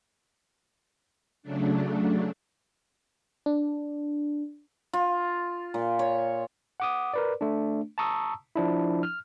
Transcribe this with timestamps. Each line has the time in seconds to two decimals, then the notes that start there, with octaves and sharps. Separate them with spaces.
1.43 C#3 F#3 A3 D4
3.46 D4
4.93 F4
5.74 A#2
5.99 C#5
6.80 F#5 D6 D#6
7.14 A#4 B4 D5
7.41 A3 D4
7.98 A5 A#5 C#6 D#6 E6
8.56 F3 D4 E4
9.03 F6